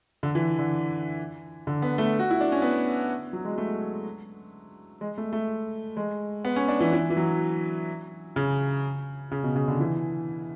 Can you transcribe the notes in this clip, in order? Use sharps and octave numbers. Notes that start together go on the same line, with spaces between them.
D3
E3
D3
D3
B3
A3
F#4
E4
D4
C#4
B3
F#3
G#3
A3
G#3
A3
A3
G#3
B3
C#4
D4
E3
E3
E3
F#3
C#3
C#3
B2
C#3
D3
E3